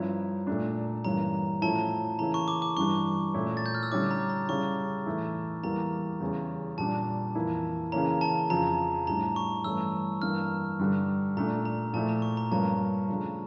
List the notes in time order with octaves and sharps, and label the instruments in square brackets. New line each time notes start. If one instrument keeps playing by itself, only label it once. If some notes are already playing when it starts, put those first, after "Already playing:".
Already playing: [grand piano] G2 F3 C#4 E4 [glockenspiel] A#5
[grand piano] A#2 A3 D4
[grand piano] G2 E3 G3 A#3 C#4 [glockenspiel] A#5
[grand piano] A2 F3 A3 C#4 E4 [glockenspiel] A5
[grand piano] C#3 E3 A#3 C#4 E4 [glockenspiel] A#5
[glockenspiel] C#6
D6
D6
[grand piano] G2 E3 G3 D4 [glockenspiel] C#6
[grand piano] A#2 A3 C#4 E4
[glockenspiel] A6
G6
F6
E6
[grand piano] D3 G3 C#4 E4 [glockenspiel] D6
[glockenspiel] A#5
A#5
[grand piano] C#3 G3 C#4 E4 [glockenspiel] C#6
[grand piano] A2 E3 A3 E4
[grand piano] E2 E3 G3 A#3 [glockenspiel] A#5
[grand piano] E2 C#3 G3 C#4
[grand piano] A#2 G3 D4 [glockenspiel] A5
[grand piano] F2 E3 A#3 E4
[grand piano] C#3 E3 A#3 C#4 [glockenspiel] A#5
[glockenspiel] A5
[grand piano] F2 C#3 F3 [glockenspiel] A#5
[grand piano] A2 G3 D4 [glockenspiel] A#5
[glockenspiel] C#6
[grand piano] G2 E3 A3 C#4 [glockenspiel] E6
[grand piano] G2 E3 A#3 D4 [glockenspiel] F6
[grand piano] G2 D3 G3 D4
[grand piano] A#2 A3 D4 [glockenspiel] A#5
[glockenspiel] A#5
[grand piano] A#2 F3 A3 E4 [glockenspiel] A5
[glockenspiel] A#5
C#6
A#5
[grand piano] G2 F3 A#3 C#4 [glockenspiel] A5
[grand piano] C#3 F3 A3 D4